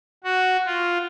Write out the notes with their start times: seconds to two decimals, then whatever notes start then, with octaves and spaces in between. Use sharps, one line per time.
0.24 F#4
0.66 F4